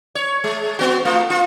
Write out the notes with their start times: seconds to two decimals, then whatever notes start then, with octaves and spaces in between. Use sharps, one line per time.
0.15 C#5
0.44 G#3
0.79 B3 F#4
1.05 A3 F4
1.30 F4